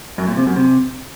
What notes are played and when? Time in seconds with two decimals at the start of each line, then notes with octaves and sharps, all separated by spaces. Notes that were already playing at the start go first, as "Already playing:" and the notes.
0.18 F#2
0.28 A#2
0.37 C3
0.47 F#2
0.56 C3